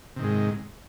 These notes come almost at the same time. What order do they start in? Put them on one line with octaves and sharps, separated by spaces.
C3 D#3 G#2 G#3